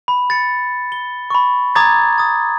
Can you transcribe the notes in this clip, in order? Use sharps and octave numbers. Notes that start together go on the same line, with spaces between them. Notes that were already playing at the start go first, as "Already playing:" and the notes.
B5
A6 C#7
G7
B5 C#6
A#5 D6 D#6 G#6 A6
D#6 A6